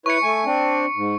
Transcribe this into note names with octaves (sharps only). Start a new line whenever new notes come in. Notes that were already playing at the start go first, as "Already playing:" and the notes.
E4 B4 C#5 C#6 C#7
A3 G#5
C4 D4
G#2